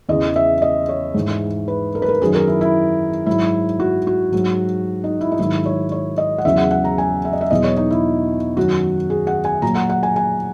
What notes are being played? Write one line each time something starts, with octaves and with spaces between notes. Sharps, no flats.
E2 C#3 E3 D#5
E5
D#5
C#5
G#2 E3
B4
A#4
B4
A#4
F#2 D#3 F#3 G#4
A#4
E4
E4
G#2 F#3 E4
F#4
F#4
G#2 F#3
D#4
E4
D#4
G#2 D#3 F#3 E4
C#5
C#5
D#5
F#5
E2 C#3 F#3 E5
F#5
F#5
A#5
G#5
E5
D#5
E5
E2 B2 F#3 D#5
C#5
D#4
E4
F#2 D#3 F#3 F#4
G#4
F#5
G#5
A#2 F#3 A#5
F#5
F#5
G#5
G#5